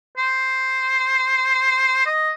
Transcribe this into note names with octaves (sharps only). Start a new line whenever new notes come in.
C5
D#5